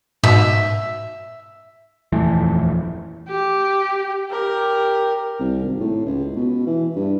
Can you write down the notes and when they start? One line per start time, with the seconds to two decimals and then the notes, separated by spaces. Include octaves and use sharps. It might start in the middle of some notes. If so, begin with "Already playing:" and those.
0.24 G#2 B2 E5
2.12 D#1 F2 E3 A3
3.28 G4
4.31 G4 A#4
5.40 C2
5.64 G#1
5.80 A2
6.05 C#2
6.36 B2
6.67 E3
6.96 G2